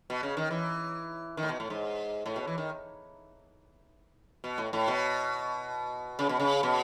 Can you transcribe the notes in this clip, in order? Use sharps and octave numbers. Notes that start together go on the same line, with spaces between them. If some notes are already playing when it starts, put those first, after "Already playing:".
B2
C#3
D#3
E3
D#3
A2
B2
A2
G#2
A2
B2
E3
D#3
B2
A2
A2
B2
C#3
B2
C#3
B2